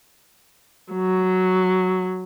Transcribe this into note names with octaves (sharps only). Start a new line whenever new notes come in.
F#3